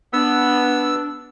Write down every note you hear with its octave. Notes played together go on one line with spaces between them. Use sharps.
B3 D4 E6